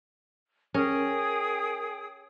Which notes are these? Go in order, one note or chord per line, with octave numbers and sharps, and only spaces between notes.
C#4 G#4 A#4 G5 D#6